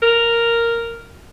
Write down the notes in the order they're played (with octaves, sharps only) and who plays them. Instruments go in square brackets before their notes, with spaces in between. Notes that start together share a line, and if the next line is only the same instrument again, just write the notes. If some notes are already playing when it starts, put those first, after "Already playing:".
[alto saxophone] A#4